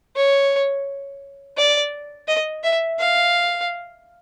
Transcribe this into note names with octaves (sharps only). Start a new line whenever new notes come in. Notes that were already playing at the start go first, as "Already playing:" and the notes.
C#5
D5
D#5
E5
F5